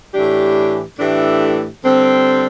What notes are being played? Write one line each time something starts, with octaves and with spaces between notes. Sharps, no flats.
A2 E3 A3 D4 G4
A2 E3 A3 D4 G4
D3 G3 C4